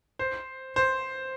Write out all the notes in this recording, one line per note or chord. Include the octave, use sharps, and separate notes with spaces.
C5
C5